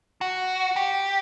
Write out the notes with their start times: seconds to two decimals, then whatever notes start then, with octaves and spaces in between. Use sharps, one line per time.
0.21 F#4
0.76 G4